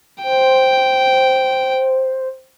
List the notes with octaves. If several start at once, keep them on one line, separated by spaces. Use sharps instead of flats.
C5 G5